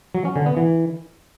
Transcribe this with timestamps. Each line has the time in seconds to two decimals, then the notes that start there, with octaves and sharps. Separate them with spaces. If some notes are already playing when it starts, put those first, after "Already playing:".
0.15 F#3
0.25 C#4
0.36 D3
0.46 B3
0.57 E3